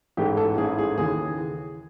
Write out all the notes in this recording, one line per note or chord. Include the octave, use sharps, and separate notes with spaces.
A1 G#2 E3 A3 G4
A4
A1 G#2 E3 A3 G#4
G#4
D#2 C#3 E3 G#4